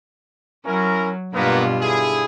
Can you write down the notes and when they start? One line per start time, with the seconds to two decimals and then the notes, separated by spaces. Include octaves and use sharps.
0.65 F#3 C#4 E4 A#4
1.34 G2 B2 A#3 B3 F4
1.81 D3 E4 G#4